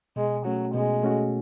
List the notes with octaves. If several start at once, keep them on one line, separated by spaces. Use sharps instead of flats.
B2 G#3
F#3 A3 C#4 F#4
B2 G#3
A3 C#4 F#4